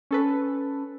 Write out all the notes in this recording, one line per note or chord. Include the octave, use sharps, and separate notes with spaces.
C#4 A4 B4